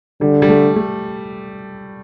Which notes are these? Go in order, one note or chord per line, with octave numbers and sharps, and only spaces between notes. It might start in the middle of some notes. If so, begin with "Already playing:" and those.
D3 G3
G3
A3
A3